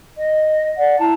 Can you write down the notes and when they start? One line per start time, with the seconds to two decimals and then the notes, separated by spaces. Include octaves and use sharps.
0.17 D#5
0.77 D5 F#5
0.99 E4 A5 A#5